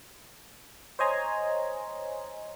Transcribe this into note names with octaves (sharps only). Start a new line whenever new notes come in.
C5 C#5 D#5 G#5 A#5 C6